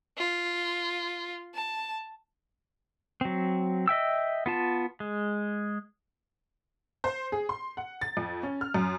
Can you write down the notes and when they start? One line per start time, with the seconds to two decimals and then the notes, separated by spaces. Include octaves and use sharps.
0.18 F4
1.55 A5
3.21 F#3 C4
3.88 D#5 E5 G5 E6
4.46 B3 F4 A5
5.00 G#3
7.04 C5
7.32 G#4
7.49 C6
7.77 F#5
8.01 A6
8.17 F2
8.43 C#4
8.61 F6
8.74 F#2